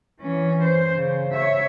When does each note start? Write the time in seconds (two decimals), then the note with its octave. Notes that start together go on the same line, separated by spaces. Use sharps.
0.20 E3 C#4
0.63 C5
0.96 C#3
1.32 C#5 E5